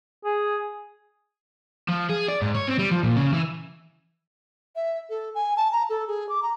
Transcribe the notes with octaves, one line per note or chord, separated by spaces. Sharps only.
G#4
F3
G#4
D5
G#2
C#5
C4
G3
F3
A#2
C#3
E3
E5
A4
G#5
A5
A#5
A4
G#4
D6
A#5